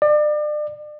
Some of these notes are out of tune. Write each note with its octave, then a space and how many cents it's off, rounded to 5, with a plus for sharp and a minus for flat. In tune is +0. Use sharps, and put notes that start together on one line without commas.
D5 +35